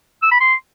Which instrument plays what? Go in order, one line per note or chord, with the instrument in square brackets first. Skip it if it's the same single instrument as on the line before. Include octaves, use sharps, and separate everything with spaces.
[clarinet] E6
B5
C6